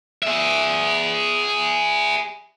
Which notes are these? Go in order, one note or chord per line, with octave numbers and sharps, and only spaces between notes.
G#4 E5